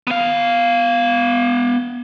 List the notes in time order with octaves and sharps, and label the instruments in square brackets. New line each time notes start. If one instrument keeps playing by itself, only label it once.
[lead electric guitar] B3 F5